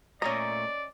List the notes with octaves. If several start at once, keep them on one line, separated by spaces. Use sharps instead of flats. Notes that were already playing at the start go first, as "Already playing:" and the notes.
A#2 A3 C#4 D5 D#5 A#5